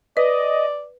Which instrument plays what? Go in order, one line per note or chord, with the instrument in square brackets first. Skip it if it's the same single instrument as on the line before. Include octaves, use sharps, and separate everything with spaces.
[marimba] B4 [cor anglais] D5 [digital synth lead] D#5